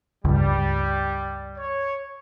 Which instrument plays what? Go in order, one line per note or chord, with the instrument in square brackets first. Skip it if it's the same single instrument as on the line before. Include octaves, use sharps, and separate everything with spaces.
[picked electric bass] C#2 G2 [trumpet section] G3
[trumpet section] C#5